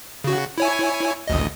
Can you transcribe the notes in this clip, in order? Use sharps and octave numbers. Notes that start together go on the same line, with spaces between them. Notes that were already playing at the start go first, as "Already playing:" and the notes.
C#3 F#4
E4 C#5 G#5
A1 D2 D#5